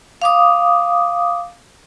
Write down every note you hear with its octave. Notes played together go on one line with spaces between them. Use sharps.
F5 D6 D#6